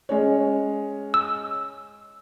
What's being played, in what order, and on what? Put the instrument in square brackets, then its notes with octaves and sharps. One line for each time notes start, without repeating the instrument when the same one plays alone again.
[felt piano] G#3 C#4 C#5
[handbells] E6